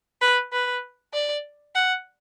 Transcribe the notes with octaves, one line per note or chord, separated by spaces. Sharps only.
B4
B4
D5
F#5